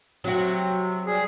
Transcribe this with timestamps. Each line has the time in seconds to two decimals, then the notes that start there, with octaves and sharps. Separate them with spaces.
0.24 C3 F#3 F#4
1.06 G3 G#4